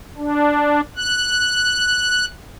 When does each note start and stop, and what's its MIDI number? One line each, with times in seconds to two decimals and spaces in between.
0.17 0.81 62
0.97 2.25 90